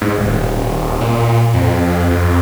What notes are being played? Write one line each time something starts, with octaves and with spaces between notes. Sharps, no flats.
G#2
D#1
A#2
F2
F2